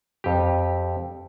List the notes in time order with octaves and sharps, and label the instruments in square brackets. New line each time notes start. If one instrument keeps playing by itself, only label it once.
[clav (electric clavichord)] F2 G4